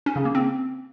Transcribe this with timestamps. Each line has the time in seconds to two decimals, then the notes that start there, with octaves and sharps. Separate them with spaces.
0.06 C#4
0.16 C#3
0.25 A#3
0.35 C4